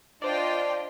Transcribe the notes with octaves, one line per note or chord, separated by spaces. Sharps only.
D4 F4 C5 D5 D#5 G5